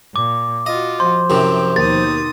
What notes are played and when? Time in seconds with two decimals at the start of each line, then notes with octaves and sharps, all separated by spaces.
0.16 A#2 D6
0.66 F4 F#4 D#5
1.00 F3 C5 C6
1.30 F#2 C3 E3 G5
1.76 D#2 B2 D#3 D#6 A6